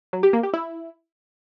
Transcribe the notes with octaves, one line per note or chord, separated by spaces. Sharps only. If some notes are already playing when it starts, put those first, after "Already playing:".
F#3
G4
A#3
G4
E4